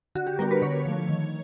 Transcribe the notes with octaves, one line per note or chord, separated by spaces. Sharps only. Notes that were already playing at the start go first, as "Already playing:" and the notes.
D3 F#4
G4
G3 B3 D4 A#4
B4
D3 C#5
F3 A3
D#3